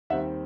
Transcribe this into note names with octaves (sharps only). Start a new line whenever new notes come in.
D#2 D#3 G3 C4 E5 F#5